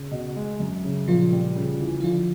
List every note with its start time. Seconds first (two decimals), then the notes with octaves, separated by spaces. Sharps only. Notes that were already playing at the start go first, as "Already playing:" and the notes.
Already playing: C#3
0.11 B2
0.36 G#3
0.60 F#2
0.84 C#3
1.08 A#2 F3 F4
1.32 G3
1.56 C#3
1.81 E3
2.00 E4
2.04 D3 F3 F4